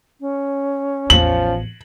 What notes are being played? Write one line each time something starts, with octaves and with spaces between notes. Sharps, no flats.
C#4
A1 E2 F3 F#7